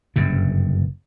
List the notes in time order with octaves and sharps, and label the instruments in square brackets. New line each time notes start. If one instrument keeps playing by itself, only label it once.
[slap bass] F#1 G2 C3